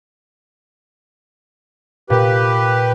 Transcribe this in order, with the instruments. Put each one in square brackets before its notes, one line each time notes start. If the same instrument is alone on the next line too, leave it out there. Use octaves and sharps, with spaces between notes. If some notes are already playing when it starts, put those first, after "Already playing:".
[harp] A#2 [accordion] G4 B4